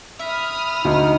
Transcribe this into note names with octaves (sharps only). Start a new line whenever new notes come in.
E5 B5 D#6 F6
D2 D#4